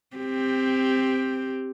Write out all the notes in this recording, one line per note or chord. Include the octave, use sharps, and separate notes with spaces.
C4 G4